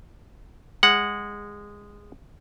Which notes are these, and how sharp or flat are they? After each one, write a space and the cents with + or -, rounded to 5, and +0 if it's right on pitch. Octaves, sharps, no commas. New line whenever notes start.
G#3 -15 F#5 +0